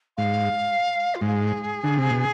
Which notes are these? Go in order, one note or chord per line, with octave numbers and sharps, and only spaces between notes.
G#2 F5
F4
G#2 G#4
D3
C3
B2